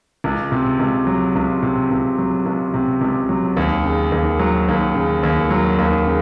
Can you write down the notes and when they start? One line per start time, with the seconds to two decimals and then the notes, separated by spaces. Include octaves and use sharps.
0.24 C#2
0.52 C3
0.79 C#2
1.07 F#3
1.35 C#2
1.63 C3
1.91 C#2
2.18 F#3
2.46 C#2
2.74 C3
3.01 C#2
3.29 F#3
3.57 D#2
3.84 C#3
4.12 D#2
4.39 F#3
4.68 D#2
4.95 C#3
5.23 D#2
5.50 F#3
5.79 D#2
6.06 C#3